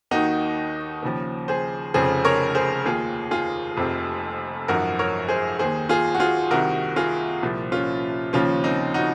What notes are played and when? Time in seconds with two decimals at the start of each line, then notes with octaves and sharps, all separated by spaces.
0.11 D#2 D#3 D#4 F#4
1.02 D#2 C#3 F3
1.48 G#4 C5
1.94 F1 F2 C#3 F3 G#4 C5
2.25 A#4 C#5
2.55 G#4 C5
2.85 D#2 D#3 F4 G#4
3.31 F4 G#4
3.77 F1 F2 C3
4.68 G#1 F#2 F3 F#4 A#4
4.99 A#4 C#5
5.29 G#4 C5
5.59 D#2 D#3 G#4 C5
5.89 F4 G#4
6.15 F#4
6.20 F4 G#4
6.51 C2 C3 D#3 F#4 A#4
6.96 F4 G#4
7.43 C2 A#2 F3
7.72 C#4 F4
8.33 D#2 C#3 F3 C#4 F4
8.64 C4 D#4
8.94 D#4 F#4